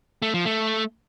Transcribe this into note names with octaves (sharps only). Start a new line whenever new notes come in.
A3
F3
A3